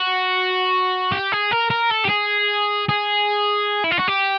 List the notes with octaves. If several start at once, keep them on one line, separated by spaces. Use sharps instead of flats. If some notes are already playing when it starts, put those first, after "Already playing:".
Already playing: F#4
G4
G#4
A#4
A#4
A4
G4
G#4
G#4
E4
F4
F#4
G4